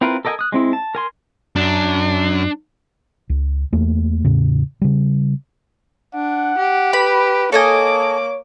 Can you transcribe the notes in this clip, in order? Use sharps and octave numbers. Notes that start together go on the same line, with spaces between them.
C4 E4 F4 A#4 B4
A4 A#4 D#5 G5 G#5
D#6 F#6
G#3 C4 E4
A5
A#4 G#5 C6
F#2 D4
C#2
E2 A3 A#3
E2 A2 C#3
C#3 G3
D4 F#5
G4
B4 B5
A#3 A4 C#5 D#5 G#5 D6